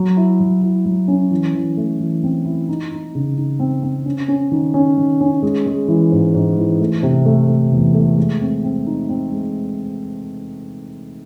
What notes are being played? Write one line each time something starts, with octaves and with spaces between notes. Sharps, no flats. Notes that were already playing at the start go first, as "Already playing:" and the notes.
Already playing: F#3
E4
F#3
E4
F#3
C#4
E3
E3
A3
E3
C4
E4
D#4
D#4
C#3
D#4
C4
C4
C#4
C#4
D#3
C#4
D#3
C#4
G#3
G#3
E3
G#2
G#2
E3
A3
C3
A3
A3
E2
A3
G#3
C4
C4
D#4
C4
G#3